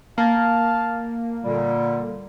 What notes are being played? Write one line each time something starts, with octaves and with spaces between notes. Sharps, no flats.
A#3 F5 A5
A#2 D3 G3